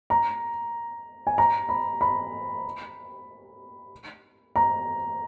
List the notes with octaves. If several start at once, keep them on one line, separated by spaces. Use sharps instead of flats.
A#5
G#5
A#5
B5
B5
A#5